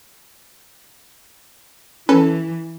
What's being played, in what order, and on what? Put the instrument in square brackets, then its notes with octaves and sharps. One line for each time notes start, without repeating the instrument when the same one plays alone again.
[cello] E3 [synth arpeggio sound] C#4 A4 B4